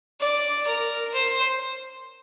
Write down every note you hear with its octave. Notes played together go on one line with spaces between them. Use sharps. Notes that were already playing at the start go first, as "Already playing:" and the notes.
D5
A#4
C5